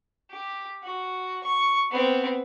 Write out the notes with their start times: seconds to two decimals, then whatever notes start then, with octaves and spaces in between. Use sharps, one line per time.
0.30 G4
0.83 F#4
1.44 C#6
1.91 B3 C4